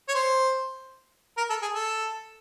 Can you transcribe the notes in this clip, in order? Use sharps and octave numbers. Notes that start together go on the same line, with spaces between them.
C#5
C5
A#4
A4
G#4
A4